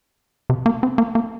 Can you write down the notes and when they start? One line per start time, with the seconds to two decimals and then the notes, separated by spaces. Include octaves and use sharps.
0.50 C3
0.66 A#3
0.83 C4
0.98 A#3
1.15 A#3